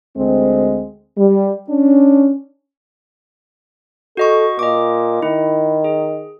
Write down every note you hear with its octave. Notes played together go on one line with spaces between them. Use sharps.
D2 G#3 C4
G3
C#4 D4
F#4 A4 D#5 C#6
A#2 D#5 D6
D#3 E4
G#4